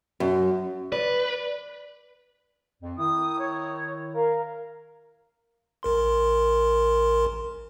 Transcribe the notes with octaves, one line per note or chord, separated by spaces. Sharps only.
F#2
B4 D5
F2
D#3 E4 D#6
C#5
A#4 F5
A1 A#4 C6